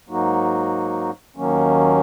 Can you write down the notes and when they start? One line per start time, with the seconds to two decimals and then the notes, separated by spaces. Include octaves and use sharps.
0.09 G#2 F#3 A#3 D#4 F#4
1.36 D#2 D#3 F#3 A#3 C#4